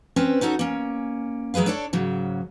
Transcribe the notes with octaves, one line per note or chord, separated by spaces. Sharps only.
C4 C#4 B4 C5
C#4 D#4 F#4 A4
A#3 C#4
F#3 G#3 G#4 B4 F5
D4 A4 C#5 D5
G#2 C#3 F#3